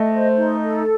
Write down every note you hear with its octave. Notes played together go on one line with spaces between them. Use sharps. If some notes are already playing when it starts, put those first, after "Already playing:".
Already playing: A3 D#5
C5
D#4
A4